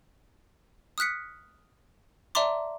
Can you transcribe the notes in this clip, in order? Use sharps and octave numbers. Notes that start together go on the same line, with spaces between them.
D#6 F6 F#6 B6 C#7
D5 E5 A5 A#5 C6 D6